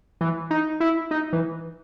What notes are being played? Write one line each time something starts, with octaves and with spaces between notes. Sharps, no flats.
E3
D#4
E4
D#4
E3